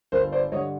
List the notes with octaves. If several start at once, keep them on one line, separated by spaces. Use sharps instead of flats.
G1 A#4 C5
C5 D5
G2 D3 C#5 D#5